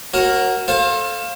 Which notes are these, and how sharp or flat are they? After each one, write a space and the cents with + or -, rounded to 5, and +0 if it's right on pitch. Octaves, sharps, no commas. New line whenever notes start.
F#4 +0 A#4 +0 C#5 -35
A4 +0 C5 +35 F5 +0